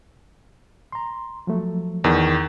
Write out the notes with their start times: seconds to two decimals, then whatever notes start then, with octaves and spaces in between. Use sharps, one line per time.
0.92 A#5 C6
1.47 F3 F#3 A3
2.04 E2 D#3